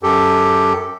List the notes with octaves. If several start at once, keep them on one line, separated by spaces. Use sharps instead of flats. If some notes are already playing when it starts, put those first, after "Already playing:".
F#2 G4 A4